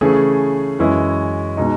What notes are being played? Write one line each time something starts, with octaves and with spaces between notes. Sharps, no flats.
C#3 E3 A3 C#4 G#4
F#2 E3 G#3 C#4 E4
B2 G#3 D#4